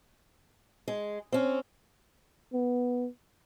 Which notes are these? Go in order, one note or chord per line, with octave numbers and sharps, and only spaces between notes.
G#3
C4 C#4
B3